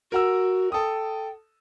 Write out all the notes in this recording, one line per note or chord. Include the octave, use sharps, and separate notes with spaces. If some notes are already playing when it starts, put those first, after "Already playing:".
F#4 A#4 F#5 E6
A4 G5 D#6